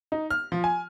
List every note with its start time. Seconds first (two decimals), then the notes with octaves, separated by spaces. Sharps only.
0.12 D#4
0.31 F6
0.52 F3
0.64 G#5